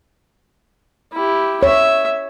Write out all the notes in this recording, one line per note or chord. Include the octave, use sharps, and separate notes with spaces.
E4 G4
C#5 E5